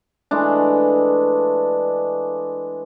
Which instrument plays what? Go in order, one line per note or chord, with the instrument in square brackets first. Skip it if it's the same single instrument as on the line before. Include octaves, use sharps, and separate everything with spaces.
[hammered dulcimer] E3 G#3 A3 D4